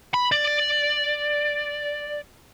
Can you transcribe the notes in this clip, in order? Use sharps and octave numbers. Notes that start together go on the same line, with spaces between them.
B5
D5